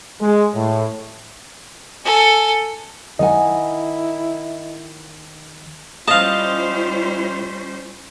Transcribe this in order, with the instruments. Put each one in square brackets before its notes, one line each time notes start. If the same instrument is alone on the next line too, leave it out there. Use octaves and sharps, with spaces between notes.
[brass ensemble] G#3
A2
[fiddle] A4 G#5
[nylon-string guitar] D#3 F#5 G#5 [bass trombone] E4 [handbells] D#5
[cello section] G3 C#4 C5 [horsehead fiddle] E4 F4 [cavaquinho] D#5 [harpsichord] F5 A5